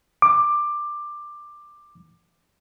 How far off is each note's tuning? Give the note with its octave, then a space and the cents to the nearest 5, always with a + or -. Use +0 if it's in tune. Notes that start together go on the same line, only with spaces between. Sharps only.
D6 +15